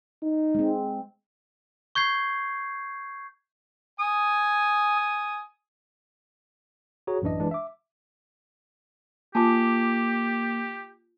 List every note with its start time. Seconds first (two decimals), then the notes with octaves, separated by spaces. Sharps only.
0.23 D#4
0.55 G#3 C4
1.95 C#6 G6 G#6 C7
4.00 G#5 D#6
7.07 F#4 G#4 C#5 A#5
7.22 A1 F#2 E3 D4 D#5
7.40 E3 G#3 D4
7.51 E5 D6
9.35 A#3 F4 G4 G#5 A5 D6